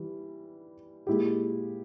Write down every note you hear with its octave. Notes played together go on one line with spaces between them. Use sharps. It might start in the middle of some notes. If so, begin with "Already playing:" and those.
Already playing: E3 G3
A#2 G#3 E4 G4